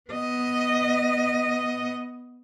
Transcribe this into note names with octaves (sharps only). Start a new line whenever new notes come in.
B3 D#5